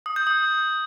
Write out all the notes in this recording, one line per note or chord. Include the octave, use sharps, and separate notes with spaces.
D#6
G6
D#6